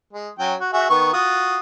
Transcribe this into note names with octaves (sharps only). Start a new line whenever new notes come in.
G#3
F#3 C#4 G5
F#4
F#4 G#4 E5
D#3 B3 C#6
F4 F#4 D#6